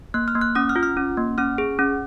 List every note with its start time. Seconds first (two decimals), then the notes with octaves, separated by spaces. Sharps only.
0.14 A#3 F#6
0.28 F6
0.35 A#3
0.41 F#6
0.55 C#4 D#6
0.69 F6
0.76 F4
0.83 F6
0.97 C#4
1.17 A#3
1.38 C#4 F6
1.58 G#4
1.79 C#4